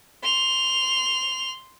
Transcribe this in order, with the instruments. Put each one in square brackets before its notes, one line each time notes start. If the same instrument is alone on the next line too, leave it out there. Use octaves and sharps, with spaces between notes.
[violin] C6 F7